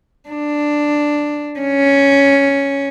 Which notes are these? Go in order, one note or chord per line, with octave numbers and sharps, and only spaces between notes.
D4
C#4